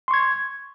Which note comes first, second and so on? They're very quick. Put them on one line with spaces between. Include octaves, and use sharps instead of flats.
C6 C#6 G#6